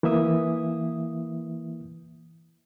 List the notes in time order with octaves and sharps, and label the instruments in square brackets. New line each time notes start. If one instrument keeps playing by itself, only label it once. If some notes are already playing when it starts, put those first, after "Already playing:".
[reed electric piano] E3 A#3 E4 E5 D#6